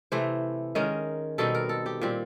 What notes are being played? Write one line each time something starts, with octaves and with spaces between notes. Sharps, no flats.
C3 E3 A3 C5
D#3 G#3 C#4 A#4
B2 G3 C4 D#4 A4
A#4
A4
G4
A#2 G3 C4